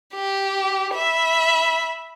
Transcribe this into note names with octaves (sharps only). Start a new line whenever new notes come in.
G4
E5 B5